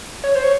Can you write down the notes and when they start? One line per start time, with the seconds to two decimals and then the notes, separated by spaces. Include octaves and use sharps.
0.24 C#5
0.35 C5
0.44 C#5